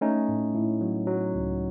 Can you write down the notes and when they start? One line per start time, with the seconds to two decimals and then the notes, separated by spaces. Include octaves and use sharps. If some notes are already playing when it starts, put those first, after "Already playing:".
0.01 A3 C#4 D#4
0.29 A2
0.55 A2
0.81 F#3
1.07 F#3
1.34 C#2